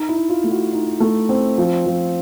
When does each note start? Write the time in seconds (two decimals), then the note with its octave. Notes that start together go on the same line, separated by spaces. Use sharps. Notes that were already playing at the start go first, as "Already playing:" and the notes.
Already playing: D#4
0.09 E4
0.16 D#4
0.30 F4
0.44 A3
0.51 F#4
0.73 D#4
1.00 A3
1.29 C4
1.58 F3
1.86 F3